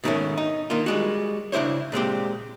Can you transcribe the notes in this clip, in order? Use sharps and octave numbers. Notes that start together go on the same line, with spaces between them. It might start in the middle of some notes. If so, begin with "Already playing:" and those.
G#2 B2 D#3 G3 A3 C#4
D#4
D#3 A#3 F4
G3 G#3 F#4
C#3 D4 E4 C5 C#5
A#2 G#3 C4 G4